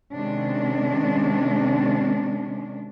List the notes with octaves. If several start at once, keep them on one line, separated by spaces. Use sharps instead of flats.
C3 D#3 G#3 C#4 D4